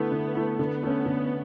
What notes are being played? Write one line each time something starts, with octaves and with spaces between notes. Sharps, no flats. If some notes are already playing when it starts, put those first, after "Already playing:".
Already playing: D3 A3 B3 E4
D3
A3 E4
D3 B3
A3 C#4
D3